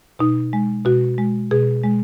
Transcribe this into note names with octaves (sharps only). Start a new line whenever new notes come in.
B2 D#4
G#3
B2 F#4
G#3
B2 G#4
G#3